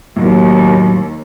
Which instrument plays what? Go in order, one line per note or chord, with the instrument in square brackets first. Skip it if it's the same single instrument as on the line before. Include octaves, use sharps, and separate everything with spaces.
[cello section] D#2 [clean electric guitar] A2 F#3